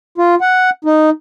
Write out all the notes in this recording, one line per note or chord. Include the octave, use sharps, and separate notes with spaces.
F4
F#5
D#4